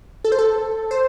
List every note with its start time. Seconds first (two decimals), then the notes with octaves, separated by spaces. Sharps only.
0.24 A4
0.32 C5
0.39 A4
0.91 C5